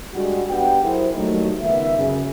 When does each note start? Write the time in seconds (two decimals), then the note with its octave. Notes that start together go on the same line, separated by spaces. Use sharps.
0.14 G3 G#3 D4 F#4
0.50 B3 D4 G4 F#5 G5
0.82 F#3 E4 G#4 A#4 C5
1.14 D#3 F#3 G3 A3 A#3 D#4
1.61 C#2 D#3 B3 E5
1.97 F#2 C#3